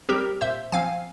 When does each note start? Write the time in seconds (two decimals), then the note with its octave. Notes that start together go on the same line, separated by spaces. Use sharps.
0.09 G3 C4 G4 A#4
0.41 A#2 C5 E5
0.72 F3 C4 F5 G#5